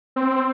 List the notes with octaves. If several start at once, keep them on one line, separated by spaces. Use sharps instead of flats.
C4